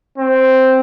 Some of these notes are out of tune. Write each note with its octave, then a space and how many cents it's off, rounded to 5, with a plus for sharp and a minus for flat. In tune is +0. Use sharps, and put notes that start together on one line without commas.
C4 +0